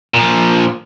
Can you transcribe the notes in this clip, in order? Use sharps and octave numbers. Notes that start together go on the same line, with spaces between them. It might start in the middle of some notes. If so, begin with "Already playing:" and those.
A#2 F3